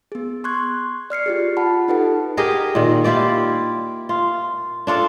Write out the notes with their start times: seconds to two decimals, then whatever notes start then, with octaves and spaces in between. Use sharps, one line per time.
0.12 B3 G#4
0.44 C6 C#6 F#6 G#6
1.10 D5 F6 C7 C#7
1.26 F4 G4 G#4
1.57 F4 F#5 A5 B5
1.88 D#4 G4 A4 B4 F#5
2.37 G4 G#4 A#4 D#5
2.75 A#2 D#3
3.04 E4 F4 G4 D5
4.09 F4
4.87 D4 F4 A4 D5